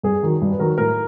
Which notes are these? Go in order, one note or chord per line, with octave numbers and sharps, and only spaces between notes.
G2 G#4
D#3 F#3
G2
B4
D#3 F#3 A#4
A2 A#4